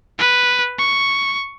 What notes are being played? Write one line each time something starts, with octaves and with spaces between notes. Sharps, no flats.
B4
C#6